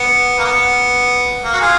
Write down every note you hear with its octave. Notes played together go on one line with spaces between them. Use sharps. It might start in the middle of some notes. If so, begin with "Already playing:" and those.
Already playing: B3
A#3
B3
A#3
F#4
F4 G#4